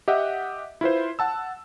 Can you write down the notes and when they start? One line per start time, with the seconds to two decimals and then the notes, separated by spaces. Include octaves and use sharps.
0.08 G4 D#5 E5 F#5
0.81 E4 F4 B4 C5
1.19 F#5 A5 E6